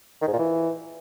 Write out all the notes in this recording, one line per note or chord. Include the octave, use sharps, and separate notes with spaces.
D#3
G#2
A#2
E3